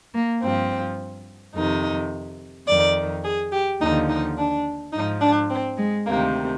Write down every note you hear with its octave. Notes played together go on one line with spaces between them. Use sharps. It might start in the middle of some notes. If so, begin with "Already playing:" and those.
A#3
G2 F3 C4
F2 C3 D#3 D#4
F2 D#3 D5
G#4
G4
D#2 D3 F3 D#4
D#4
D4
G#2 F3 D#4
D4
C4
G#3
D2 C3 D#3 A#3